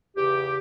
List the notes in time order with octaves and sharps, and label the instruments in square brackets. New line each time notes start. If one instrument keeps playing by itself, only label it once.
[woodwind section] E2 C#3 E3 G4